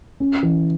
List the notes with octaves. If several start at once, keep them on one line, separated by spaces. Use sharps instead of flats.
C#4
E3